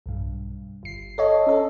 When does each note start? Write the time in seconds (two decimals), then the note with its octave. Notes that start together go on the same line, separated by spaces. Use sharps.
0.06 B1 G2
0.83 G1 C7
1.18 A4 C#5 D#5
1.47 C#4 A4